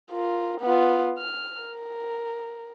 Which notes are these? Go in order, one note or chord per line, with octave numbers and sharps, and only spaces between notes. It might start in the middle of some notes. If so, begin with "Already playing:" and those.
F4 A#4
B3 F4
F6
A#4